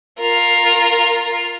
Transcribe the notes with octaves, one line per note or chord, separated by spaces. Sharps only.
F4 A#4